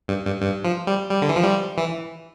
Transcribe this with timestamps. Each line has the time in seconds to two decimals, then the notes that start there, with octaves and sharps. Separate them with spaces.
0.08 G2
0.25 G2
0.42 G2
0.64 F3
0.87 G3
1.09 G3
1.22 D3
1.29 E3
1.36 F3
1.44 G3
1.78 E3